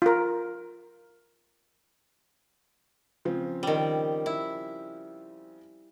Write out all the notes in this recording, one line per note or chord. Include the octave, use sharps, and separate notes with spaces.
F4 A#4
C#3 F3 C4
D#3 G3
E4